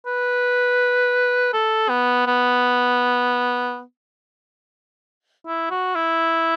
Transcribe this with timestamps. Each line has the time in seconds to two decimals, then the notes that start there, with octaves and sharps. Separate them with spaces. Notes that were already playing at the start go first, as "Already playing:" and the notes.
0.06 B4
1.53 A4
1.89 B3
2.27 B3
5.47 E4
5.70 F#4
5.95 E4